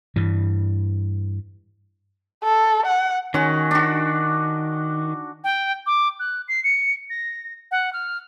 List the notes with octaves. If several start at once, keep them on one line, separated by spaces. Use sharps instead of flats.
G2 E3
A4
F#5
D#3 C#4 F#4
D4 F#4
G5
D6
F#6
C7
C#7
A#6
F#5
F6